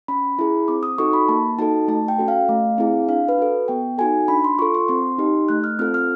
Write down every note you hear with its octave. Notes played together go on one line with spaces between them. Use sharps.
C#4 B5
E4 G#4
C4 D6
D#6
D#4 F#4 A4 C#6
B5
A#3 A5
D#4 F#4 A4 A5
A3 A5
G5
C#4 F#4 A4
F5
A3
C4 E4 G#4
D4 F5
B4
F#4 A4
B3 G5
D#4 F#4 A4 G#5
D4 B5
C6
F4 A4 C#6
C6
C4 C6
D#4 G4
A3 F#6
F6
C4 F4 A4 F6
F6